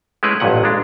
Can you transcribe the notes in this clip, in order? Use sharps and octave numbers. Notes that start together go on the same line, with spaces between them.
G#3 A3 C#4 E4 G#4 B4
A1 G2 A#2 F#5
G#3 D4